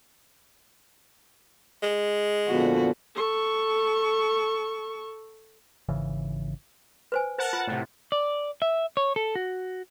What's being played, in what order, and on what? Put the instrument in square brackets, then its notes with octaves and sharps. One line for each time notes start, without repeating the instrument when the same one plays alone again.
[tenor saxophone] G#3
[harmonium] A#2 D3 F3 [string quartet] B3 F#4
[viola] A4 C#6
[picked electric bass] G#1 C#3 E3
[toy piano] B4 C5 G#5
[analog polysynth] A#4 F#5 A5 [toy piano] C5
[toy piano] F4
[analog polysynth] A2 C3
[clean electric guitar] D5
E5
C#5
A4
F#4